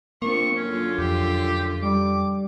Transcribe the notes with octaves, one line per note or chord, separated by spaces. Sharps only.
A#3 C4 D4 F4 C#6
F#2 D3 C#4 F4
F2 G4
G3 D6